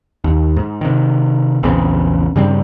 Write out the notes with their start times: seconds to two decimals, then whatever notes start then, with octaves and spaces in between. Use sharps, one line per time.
0.24 D#2
0.56 G#2
0.81 C3 D#3
1.63 A#1 E2 C#3 C4
2.36 G2 C#3 G3 C4